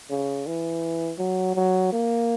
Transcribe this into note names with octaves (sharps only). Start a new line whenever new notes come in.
C#3
E3
F#3
F#3
A#3